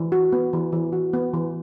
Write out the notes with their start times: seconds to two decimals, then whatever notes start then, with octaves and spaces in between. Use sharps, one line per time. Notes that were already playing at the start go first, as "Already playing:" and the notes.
Already playing: E3
0.12 F#4
0.33 B3
0.53 E3
0.73 E3
0.93 F#4
1.13 B3
1.34 E3